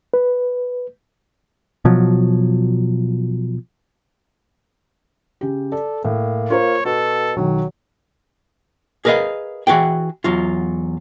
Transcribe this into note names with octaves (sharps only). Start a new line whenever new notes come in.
B4
B2 F3 F#3
C#3 G4
A4 D5
A2 A#3
F4 A#4 C5 C#5
B2 F#4 A4
B1 D#3 F#3
G#4 A#4 B4 D5 D#5 F5
E3 F#4 G#4 G5
E2 F#3 F4